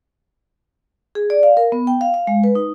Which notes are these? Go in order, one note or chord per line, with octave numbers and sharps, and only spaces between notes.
G#4
D5
F5
A#4
B3
G5
F5
F5
G#3
B4
D#4